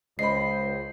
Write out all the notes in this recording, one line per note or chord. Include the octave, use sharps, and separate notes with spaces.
C#2 C5 D#5 B5 C7